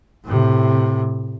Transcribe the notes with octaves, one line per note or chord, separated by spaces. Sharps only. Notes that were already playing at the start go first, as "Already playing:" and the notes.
A2 C3